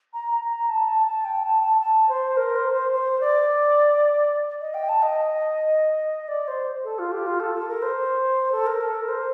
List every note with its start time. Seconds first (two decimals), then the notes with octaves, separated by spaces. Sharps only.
0.13 A#5
0.31 A#5
0.50 A#5
0.69 A5
0.87 A5
1.07 A5
1.25 G5
1.43 A5
1.63 A5
1.81 A5
2.09 C5
2.37 A#4
2.55 C5
2.74 C5
2.92 C5
3.21 D5
4.61 D#5
4.74 G5
4.89 A5
5.02 D#5
6.28 D5
6.48 C5
6.84 A4
6.99 F4
7.12 G4
7.26 F4
7.40 A4
7.55 A4
7.68 A#4
7.82 C5
8.52 A4
8.66 A#4
8.81 A4
8.95 A#4
9.09 C5